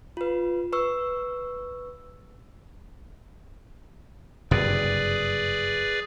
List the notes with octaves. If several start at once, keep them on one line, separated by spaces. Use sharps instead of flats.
F4 B4
B4 C#6 E6
F#1 G2 C3 G#4 B4 D5